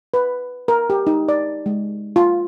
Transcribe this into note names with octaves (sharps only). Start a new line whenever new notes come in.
B4
A#4
G4
D#4
D5
G#3
F4